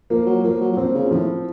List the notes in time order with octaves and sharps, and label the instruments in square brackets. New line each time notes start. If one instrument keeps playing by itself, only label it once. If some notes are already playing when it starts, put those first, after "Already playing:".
[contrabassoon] F3 [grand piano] A#3
[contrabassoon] F#3
[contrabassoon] F3 [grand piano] A#3
[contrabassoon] F#3
F#3
[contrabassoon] F3 [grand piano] C4
[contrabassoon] C#3
[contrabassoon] A2 [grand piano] F3